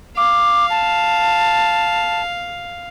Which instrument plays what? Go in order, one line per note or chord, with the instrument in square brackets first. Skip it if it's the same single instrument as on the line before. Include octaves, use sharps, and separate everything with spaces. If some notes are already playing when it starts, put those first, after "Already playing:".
[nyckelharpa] F5 [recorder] D6
[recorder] A5